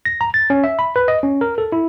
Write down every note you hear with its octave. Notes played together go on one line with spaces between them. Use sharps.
A#6
A#5
A6
C#4
E5
B5
B4
D#5
C#4
A#4
A4
E4